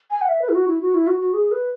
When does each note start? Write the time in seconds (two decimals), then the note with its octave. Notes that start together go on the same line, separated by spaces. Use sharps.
0.11 G#5
0.21 F#5
0.29 E5
0.42 B4
0.49 E4
0.55 F#4
0.68 E4
0.81 F#4
0.95 E4
1.07 F#4
1.21 F#4
1.34 G#4
1.52 B4